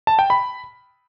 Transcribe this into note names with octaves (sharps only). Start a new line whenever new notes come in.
A5
G5
B5